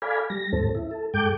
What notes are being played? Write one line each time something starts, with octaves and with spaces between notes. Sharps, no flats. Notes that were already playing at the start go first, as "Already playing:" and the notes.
A4 D5 F5 G#5 B5
G3 A#6
D#2 G#2 C4 A4
E4
A4
G2 G#3 A4 G5 D6 G6